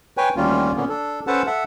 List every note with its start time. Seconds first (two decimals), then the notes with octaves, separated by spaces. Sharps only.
0.17 B4 C#5 G5 G#5
0.37 D2 D#3 G3 A#3 C#4 F4
0.76 A#2 D3 A#3 B3 C#4
0.89 D4 A4
1.27 C#4 A4 B4 C5 F#5 A5
1.47 A4 E5 F#5